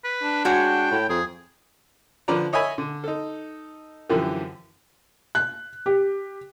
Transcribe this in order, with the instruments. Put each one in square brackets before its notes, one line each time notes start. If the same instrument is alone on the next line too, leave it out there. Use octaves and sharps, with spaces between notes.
[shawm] B4
[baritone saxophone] D4
[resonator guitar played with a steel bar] G#3 F#4 C#5 [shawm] G5
[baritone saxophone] A2
[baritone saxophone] F2 [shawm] G#4
[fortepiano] D3 F3 B4 D5 A#5
C#5 D#5 E5 G#5 B5
D3
D#4 A4
F#2 D3 E3 F3 G4
[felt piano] F#6
G4